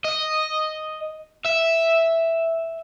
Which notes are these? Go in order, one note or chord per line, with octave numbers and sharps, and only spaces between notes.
D#5
E5